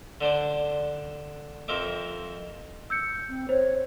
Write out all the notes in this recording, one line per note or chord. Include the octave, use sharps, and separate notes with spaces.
D3 D4 C5 D5
F2 A#4 C5 E5 D6
E6 G6 C#7
C4
C5 C#5